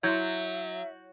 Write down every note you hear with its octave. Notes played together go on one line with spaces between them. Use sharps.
F#3 E4 E5 C6 G6 G#6